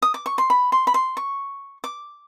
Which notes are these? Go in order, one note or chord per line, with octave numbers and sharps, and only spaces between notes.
D#6
D6
C#6
C6
B5
C6
B5
C6
C#6
D6